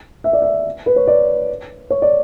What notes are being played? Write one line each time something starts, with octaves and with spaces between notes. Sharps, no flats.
E5
D5
E5
B4
C#5
D5
C#5
D5